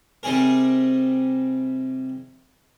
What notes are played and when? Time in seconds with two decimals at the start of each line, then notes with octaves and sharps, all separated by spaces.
0.23 C3 G3 D#4 G#4 A#4